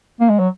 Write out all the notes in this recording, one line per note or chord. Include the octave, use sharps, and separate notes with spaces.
A#3
G#3
F#3